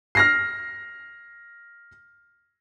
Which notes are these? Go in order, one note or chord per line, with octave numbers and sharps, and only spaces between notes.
F6 A#6 C7